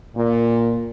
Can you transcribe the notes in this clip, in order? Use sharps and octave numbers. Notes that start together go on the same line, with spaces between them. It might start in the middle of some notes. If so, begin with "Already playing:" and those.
A#2